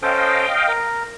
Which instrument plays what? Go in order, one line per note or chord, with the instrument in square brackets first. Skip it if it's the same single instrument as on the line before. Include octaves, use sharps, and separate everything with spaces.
[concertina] C#4 A4 C5 [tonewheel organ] D#5 F5 G5
[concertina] A#4